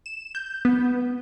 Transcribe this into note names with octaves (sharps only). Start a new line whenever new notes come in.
E7
G6
B3